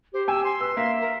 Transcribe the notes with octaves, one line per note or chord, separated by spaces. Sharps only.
G4 C5
G5 G#5 E6
C6
B4 E6
A#3 E5
A#4